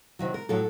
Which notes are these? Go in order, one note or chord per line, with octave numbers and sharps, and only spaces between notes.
C3 D#3 F#3
A#4
A2 F#3 A4